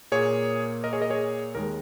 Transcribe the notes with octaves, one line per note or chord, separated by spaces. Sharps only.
A#2 A#3 G#4 C#5
A#4 D#5
G#4 C#5
A#4 D#5
G#4 C#5
D#2 D#3 G#3 A#4